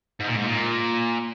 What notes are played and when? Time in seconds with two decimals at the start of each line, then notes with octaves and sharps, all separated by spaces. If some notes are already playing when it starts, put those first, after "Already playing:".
0.20 G#2
0.28 A#2
0.35 G#2
0.46 A#2